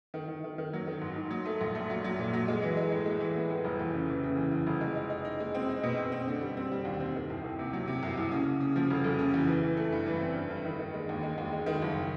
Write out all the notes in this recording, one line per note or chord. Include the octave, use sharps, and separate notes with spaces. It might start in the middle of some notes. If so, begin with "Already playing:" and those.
D#3
D#3
D#3
D#3
F#3
D#3
G#2
G#2
F#3
A3
A#1
A3
F#3
F#3
A#2
F#3
G#3
E3
G#3
A2
G#3
E3
B3
A2
F1
E2
C#3
E3
C#3
E2
E2
F1
G#3
D#4
D#4
D#4
G#3
C4
D#4
B2
C4
C4
D3
G3
C4
G3
D#2
C4
D#3
C2
D#3
C3
F#3
C3
C2
C2
C#3
C#3
C#3
F3
F1
F1
C#3
E2
E3
E3
A3
G2
E3
C4
G2
G2
D#3
D#3
G#3
D#2
G#3
D#2
G#3
D#3
F#1